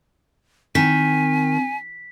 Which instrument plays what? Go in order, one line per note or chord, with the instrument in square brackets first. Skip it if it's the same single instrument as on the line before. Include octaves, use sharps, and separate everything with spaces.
[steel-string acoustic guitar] D#3 [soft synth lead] C4 [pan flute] G#5 [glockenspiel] B6